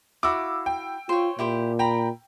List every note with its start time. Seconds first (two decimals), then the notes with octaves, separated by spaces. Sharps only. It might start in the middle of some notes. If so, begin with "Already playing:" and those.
0.23 E4 F#4 F5 D6 E6
0.66 G5
1.09 F4 C5 C#5
1.39 A#2 E4 G4 C5
1.79 G5 A#5 B5